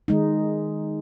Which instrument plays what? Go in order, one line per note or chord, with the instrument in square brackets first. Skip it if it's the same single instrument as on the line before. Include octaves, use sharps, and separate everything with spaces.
[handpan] D#3 G#3 D#4